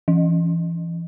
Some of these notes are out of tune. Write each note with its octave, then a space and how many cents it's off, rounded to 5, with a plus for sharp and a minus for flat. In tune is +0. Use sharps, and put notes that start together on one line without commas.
E3 +30